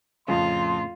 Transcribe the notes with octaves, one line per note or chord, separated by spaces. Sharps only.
F2 A2 C#3 F3 F4 C6